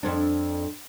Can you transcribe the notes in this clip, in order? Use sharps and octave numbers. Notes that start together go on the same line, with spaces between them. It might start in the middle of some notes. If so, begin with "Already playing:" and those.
F2 C4 D4